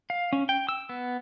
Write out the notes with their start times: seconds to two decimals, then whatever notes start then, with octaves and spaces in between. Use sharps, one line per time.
0.10 F5
0.33 C#4
0.49 G5
0.69 E6
0.89 B3